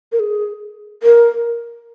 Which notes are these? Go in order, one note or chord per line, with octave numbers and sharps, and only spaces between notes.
A#4
G#4
A#4